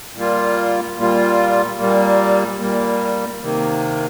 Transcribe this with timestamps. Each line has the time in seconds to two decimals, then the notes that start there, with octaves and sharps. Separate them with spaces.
0.15 A#2 G3 A#3 F4
0.97 A#2 G3 A#3 F4
1.79 A#2 G3 A#3
2.59 A#2 G3 A#3
3.41 C3 D#3 A#3